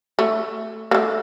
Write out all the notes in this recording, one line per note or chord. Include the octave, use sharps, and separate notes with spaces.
A3
A#3
A3